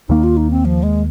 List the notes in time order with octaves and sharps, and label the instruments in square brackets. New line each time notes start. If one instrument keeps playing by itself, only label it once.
[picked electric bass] D#2 D#3 A#3 [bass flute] D#4
[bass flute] F4
D#4
C4
F3
G#3